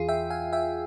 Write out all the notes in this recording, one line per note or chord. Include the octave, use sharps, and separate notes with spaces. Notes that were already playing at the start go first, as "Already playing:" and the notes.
Already playing: E2 E3 F4 G#4
E5 G5
F5 G#5
E5 G5